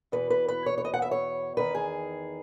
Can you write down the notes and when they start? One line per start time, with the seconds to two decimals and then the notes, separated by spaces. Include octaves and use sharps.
0.12 E2 B2 B4
0.30 B4
0.48 B4
0.66 C#5
0.78 C#5
0.85 D#5
0.94 F#5
1.02 E5
1.11 C#5
1.57 E2 D#3 B4
1.75 G#4